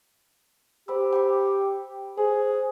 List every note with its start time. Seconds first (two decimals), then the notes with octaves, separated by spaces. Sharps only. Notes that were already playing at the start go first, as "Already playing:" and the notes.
0.88 G4 C5 B5 E6
1.13 G5 B5 D6
2.18 G#4 C5